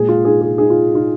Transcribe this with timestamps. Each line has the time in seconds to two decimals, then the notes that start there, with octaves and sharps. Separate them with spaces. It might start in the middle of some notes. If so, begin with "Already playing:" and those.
Already playing: A#2 G#3 G#4
0.08 F4
0.25 D#4 G#4
0.42 G#4
0.58 D#4 G#4
0.70 F4
0.92 D#4 F4